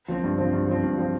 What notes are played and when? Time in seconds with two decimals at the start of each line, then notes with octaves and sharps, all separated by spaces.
0.08 F3 C4
0.24 G2
0.38 F3 C4
0.53 G2
0.68 F3 C4
0.83 G2
0.98 F3 C4